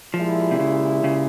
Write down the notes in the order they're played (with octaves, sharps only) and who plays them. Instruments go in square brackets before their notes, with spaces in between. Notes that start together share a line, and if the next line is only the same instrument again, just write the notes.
[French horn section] A#2 G#3 E4 G4 [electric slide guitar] F3
[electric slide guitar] C3
C#3
C#3